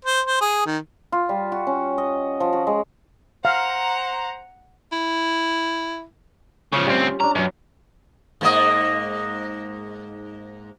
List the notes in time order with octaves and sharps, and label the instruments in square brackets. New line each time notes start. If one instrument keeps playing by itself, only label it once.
[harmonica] C5
C5
G#4
D#3
[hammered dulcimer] F4
G3
F#4
C#4
D#5
F3
F#4
G#3
[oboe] C5 [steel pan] F5 [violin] F#5 [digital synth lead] A#5
[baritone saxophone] E4
[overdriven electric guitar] C#3 F3 [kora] C#4
[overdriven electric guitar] D2 C4 [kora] G3 F4
[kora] C#4 D4 [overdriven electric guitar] A#5
[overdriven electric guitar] F#2 [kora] F#3 B3
[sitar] G#2 A#3 D#5